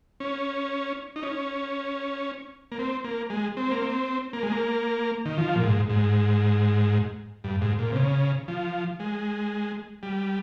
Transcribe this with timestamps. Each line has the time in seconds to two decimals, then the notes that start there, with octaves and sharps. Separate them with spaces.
0.20 C#4
1.16 D#4
1.23 C#4
2.72 A#3
2.79 C4
3.04 A#3
3.30 G#3
3.57 C4
3.71 A#3
3.82 C4
4.33 A#3
4.43 G#3
4.52 A#3
5.25 D#3
5.38 F3
5.56 A#2
5.63 G#2
5.90 G#2
7.44 G2
7.61 G#2
7.79 A#2
7.92 C3
7.96 C#3
8.48 F3
9.00 G#3
10.03 G3